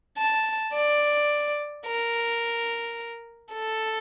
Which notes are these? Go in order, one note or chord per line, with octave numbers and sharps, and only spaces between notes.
A5
D5
A#4
A4